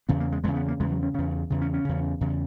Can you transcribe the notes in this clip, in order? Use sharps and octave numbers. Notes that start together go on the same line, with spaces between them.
E2 C#3 B3
A#3
G#3
E2 C#3 G#3
B3
A#3
E2 C#3 G#3
F#3
C#4
E2 C#3 C#4
E2 C#3
C#4
C#4
E2 C#3
E2 C#3